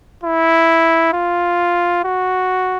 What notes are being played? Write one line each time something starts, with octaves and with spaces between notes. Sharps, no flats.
E4
F4
F#4